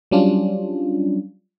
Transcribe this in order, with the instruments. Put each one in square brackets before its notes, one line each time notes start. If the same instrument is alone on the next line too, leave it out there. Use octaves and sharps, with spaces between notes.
[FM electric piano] F#3 G3 C#4 D4 F4